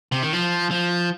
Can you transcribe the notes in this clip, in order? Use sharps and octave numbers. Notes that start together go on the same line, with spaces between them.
C3
D#3
F3
F3